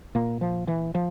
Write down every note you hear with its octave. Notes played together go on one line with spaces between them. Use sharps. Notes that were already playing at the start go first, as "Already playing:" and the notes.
A#2 A#3
F3
E3
F3